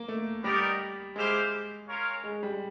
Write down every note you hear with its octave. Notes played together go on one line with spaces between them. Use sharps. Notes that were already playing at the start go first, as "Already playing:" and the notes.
Already playing: A#3
A3
G3 B3 D#4 G4 A#4 D5
G#3 C4 E4 G4 C5 F5
C#4 F4 A#4 C#5 F5
G#3
G3